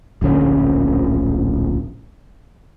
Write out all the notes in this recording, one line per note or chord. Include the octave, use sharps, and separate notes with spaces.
D1 A#1 D3 C#4